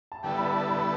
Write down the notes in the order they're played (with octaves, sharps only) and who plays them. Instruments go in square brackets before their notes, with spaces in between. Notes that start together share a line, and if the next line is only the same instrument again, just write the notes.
[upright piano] A5
[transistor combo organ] D3 G3 B3 E4 A4 [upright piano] G5
[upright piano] B5
A5
B5